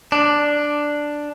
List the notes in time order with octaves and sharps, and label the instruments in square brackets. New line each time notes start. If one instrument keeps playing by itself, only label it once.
[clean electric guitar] D4